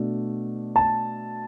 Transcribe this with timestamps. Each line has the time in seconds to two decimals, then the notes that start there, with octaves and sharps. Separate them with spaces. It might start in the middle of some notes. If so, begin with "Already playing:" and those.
Already playing: B2 A3 D4
0.76 A5